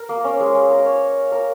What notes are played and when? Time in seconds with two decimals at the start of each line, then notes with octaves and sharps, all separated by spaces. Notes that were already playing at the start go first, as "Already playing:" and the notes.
Already playing: A#4
0.09 A#3
0.24 C#4
0.40 G#3
0.55 G#3
0.70 A#4
0.86 C#5
1.32 A#4